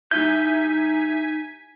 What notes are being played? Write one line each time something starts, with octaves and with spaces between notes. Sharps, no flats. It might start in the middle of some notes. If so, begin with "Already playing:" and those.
C2 D#4 E4 G#5 G6 B6